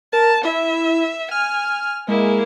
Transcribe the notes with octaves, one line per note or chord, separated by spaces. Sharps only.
A#4 A5
E4 E5
G#5 F6
G#3 A#3 E4